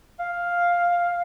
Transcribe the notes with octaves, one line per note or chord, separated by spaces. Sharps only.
F5